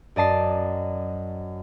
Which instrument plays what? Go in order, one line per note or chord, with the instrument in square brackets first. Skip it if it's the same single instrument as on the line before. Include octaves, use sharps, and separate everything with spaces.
[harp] F#2 D5 D#5 A5 C7